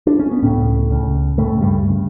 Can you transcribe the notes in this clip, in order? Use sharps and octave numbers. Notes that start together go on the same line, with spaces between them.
D4
C#4
B3
C#2 A2 C#3 A3
C#2 C#3
C#2 A2 C#3 A3
G2 G3
C#3